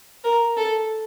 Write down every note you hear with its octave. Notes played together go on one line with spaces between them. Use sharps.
A#4
A4